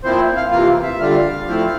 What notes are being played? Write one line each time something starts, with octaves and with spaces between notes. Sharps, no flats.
A#2 F3 C4 E4 C5
F5
C3 E3 A#3 F4 F5
E5
D3 G3 D4 F4 F5
F3 A3 C4 E4